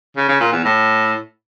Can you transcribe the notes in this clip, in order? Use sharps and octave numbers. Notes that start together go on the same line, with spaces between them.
C#3
C#3
A#2
E2
A2